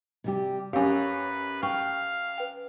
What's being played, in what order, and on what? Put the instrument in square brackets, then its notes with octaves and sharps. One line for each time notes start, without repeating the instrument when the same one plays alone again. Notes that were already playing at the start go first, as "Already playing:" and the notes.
[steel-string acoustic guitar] C3 G3 G4
[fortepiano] F#2 G4 [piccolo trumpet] B4 [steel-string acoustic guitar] C#5 [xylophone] F5 G#5
[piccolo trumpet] F5 [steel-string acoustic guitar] G5 [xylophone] C#6
[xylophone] B4 G5